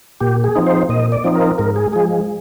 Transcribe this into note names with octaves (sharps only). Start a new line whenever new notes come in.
A#2 G4
G#4
F3 C4 D#4
C5
A#2 D#5
D5
F3 C4 D#4
A#4
G#2 A#4
G#4
F3 G#3 G#4